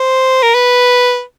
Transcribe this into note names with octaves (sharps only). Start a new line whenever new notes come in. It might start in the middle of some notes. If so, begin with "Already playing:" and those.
Already playing: C5
A#4
B4